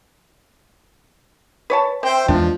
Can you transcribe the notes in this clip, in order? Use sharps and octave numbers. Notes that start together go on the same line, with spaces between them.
B4 C#5 A5
C4 C5 E5 G5
E2 F3 G#3 D4